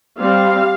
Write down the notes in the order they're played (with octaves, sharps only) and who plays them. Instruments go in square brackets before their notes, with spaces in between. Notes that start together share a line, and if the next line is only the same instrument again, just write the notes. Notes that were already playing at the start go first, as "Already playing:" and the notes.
[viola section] G3 C4 F5